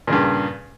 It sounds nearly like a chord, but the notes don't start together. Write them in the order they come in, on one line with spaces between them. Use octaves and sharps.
A#2 C#3 G2